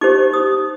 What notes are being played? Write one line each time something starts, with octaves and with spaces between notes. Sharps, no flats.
D#4 G4 C5 D6
D#6